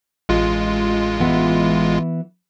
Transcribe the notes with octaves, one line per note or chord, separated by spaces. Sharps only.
A1 G#3 F4
E3 B3